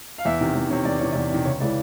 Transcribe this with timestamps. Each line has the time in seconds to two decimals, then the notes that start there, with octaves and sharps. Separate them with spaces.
0.18 F5
0.25 E2 E5
0.41 C3 D#3
0.55 E2
0.70 C3 D#3 C#5
0.85 E2 D5
0.99 C3 D#3 C#5
1.12 E2 D5
1.31 C3 D#3
1.45 C#2 C#5
1.60 C#3 E3 G#3 D5